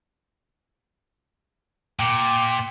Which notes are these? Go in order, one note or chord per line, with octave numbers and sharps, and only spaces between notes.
A#2 G5 D6